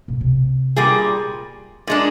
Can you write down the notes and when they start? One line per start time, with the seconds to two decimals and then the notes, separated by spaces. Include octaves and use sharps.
0.08 A#2
0.21 C3
0.76 A#2 G3 G#4
1.87 A#2 G#3 D4